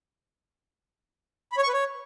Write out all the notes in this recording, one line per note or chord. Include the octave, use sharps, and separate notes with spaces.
B5
C#5
C#6
B4
C#5